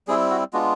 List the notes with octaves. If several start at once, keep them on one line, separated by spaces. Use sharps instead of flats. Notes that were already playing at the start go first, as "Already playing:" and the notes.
G3 C4 E4 G#4
F#4
G#3 B3 D4 F4 F#4